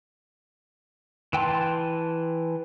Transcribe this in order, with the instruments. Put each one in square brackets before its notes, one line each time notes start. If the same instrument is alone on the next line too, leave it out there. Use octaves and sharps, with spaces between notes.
[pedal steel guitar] E3 G5 A5 C6